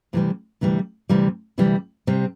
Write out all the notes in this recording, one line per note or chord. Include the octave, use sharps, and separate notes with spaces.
D2 C3 E3 G3
D2 C3 E3 G3
D2 C3 E3 G3
D2 C3 E3 G3
C3 G3 C4